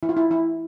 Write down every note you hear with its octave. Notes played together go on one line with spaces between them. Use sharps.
E3 E4
F4
E4
E3 E4